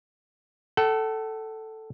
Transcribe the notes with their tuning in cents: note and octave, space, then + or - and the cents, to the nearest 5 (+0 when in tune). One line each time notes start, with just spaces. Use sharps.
A4 +0 F#5 +45